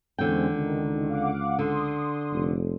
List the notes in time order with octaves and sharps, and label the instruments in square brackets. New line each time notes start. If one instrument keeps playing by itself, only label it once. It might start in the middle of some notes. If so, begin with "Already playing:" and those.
[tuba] E2 [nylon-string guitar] D3 G5 [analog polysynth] G#3 C4 C#4
[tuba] C#2 [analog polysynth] D#3
[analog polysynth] F5 F#5 D6
[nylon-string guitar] D3 [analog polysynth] C6 D#6
[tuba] F1